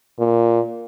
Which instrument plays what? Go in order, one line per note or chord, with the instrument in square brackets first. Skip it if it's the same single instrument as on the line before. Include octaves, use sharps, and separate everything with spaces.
[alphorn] A#2